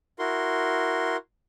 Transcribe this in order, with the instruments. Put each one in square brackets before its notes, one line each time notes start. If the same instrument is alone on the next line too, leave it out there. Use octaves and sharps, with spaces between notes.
[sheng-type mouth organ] E4 F#4 A#4 C6